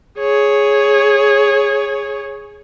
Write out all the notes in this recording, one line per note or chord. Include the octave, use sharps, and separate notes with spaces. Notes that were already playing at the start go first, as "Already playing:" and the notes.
G#4 C#5